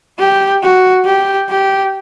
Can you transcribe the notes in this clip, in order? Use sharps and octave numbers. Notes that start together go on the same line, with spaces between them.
G4
F#4
G4
G4